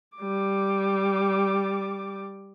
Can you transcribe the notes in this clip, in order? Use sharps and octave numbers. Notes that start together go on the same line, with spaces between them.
G3 D6